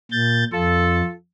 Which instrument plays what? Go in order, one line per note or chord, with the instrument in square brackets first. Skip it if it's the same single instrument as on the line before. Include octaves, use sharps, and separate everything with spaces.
[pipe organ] A#2 G6 A6
[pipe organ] F2 [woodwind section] F4 A4